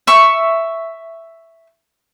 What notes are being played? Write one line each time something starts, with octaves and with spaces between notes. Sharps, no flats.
E5 C#6